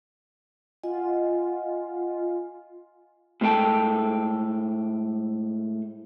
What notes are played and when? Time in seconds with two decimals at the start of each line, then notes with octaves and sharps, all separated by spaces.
0.84 F4 D#5 F#5 G#5
3.41 A2 G#3 B3 A4 G5 A5